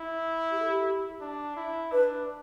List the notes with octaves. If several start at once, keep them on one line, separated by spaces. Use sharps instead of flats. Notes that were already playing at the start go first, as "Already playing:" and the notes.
Already playing: E4
G4
A4
G4
D4
E4
D4 B4